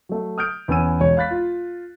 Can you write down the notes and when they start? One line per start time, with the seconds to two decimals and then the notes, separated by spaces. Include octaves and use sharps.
0.09 F#3 A3
0.38 D#6 F6 G6 D7
0.68 E2 B3 C#4 G#5 E6 D#7
1.01 E1 C#5
1.17 F5 B5 F#6 A6 B6
1.31 F4